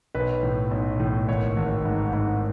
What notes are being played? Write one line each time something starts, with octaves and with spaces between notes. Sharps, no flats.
B1 B4
A2
B1
A2
G#1 C#5
G#1
G#2
G#2